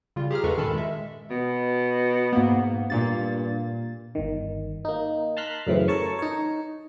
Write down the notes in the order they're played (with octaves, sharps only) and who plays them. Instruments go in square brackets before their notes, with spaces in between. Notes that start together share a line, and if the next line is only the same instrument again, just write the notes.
[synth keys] C#3 G3 F4
G4 G#4 A#5 F6
E2 G2 G#3 A4 B4 C#6
A#2 D#3 C#4 A4 A5 B5
G#3 E5
[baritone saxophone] B2
[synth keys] G#2 A#3 B3
[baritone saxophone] G2 [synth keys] A#2 A#3 A6
[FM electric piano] G1 D#3
A#3 D#4
A5 A#5 C6 F6 F#6 B6
F#2 A2 C#3 E3 C4
A4 A#4 C#5 A5 C#6
D#4 C#5